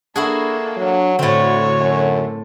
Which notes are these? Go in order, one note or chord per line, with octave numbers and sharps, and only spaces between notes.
A#3 D4 E4 F#4 G#4 A4
F#3
D2 A2 D3 C4 F#4 C#5
F#2